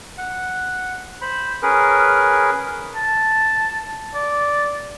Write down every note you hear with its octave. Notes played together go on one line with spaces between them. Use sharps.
F#5
C5 B5
C#4 G#4 A#4 B4
A5
D5